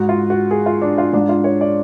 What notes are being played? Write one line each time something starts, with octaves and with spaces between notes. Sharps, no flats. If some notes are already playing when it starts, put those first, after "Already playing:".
Already playing: G#2 F#4
F4
F#4
G#4
F4
D4
F4
G#2 D4
F4
C#5
D5